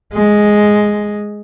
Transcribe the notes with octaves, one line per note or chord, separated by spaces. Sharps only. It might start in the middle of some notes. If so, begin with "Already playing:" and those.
G#3